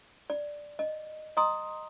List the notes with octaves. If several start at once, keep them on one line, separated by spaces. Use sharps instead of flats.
D5
D#5
D#5 A#5 C6 D#6